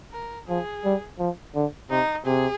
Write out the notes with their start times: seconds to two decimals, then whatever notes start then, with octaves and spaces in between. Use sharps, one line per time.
0.13 A#4
0.48 F3 G#4
0.84 G3
1.19 F3
1.55 D3
1.90 C3 D#4
2.26 C3 G#4